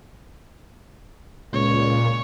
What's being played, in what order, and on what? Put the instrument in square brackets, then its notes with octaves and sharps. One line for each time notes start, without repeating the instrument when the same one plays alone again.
[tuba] C#2 [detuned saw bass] A#2 [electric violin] C#5